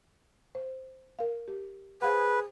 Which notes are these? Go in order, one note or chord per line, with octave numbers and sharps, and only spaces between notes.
C5
A#4 F5
G4
G#4 B4 C5 F5 F#5